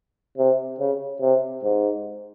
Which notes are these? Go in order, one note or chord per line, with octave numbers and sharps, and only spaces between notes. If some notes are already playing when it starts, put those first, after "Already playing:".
C3
C#3
C3
G#2